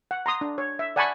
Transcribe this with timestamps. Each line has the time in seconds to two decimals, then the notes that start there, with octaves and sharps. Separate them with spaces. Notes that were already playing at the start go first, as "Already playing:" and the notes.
0.11 F#5
0.26 A#5 C6 D#6
0.41 D4
0.58 C#5
0.79 E5
0.96 D5 F#5 G#5 A5 B5 C#6